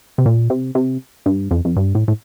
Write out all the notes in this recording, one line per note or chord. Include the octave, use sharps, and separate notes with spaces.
C3
A#2
C3
C3
G2
F2
F2
G2
A2
A2